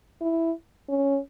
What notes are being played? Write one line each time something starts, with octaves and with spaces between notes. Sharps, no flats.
E4
C#4